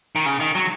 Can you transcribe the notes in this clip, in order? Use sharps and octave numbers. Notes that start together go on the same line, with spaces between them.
D#3
C#3
D#3
F#3